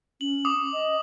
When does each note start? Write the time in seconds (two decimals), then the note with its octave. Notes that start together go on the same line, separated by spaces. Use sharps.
0.21 C#4 F#7
0.45 D6 D#6
0.73 D#5